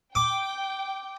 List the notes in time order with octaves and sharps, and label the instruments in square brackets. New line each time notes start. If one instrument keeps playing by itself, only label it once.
[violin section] G5 [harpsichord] D6